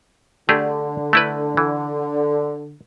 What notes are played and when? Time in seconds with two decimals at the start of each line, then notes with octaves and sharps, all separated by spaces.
0.49 D3 A3 G4 G#4
1.13 A3 E4 B4
1.57 E3